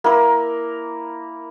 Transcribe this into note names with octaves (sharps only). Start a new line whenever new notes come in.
A#3 E4 A#4